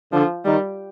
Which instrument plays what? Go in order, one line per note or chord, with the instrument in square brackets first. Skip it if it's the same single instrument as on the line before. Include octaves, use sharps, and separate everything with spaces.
[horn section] D3 [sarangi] F3
[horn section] D#3 [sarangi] G3